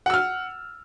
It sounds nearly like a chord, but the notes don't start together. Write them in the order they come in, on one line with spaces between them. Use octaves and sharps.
F#5 E6 F6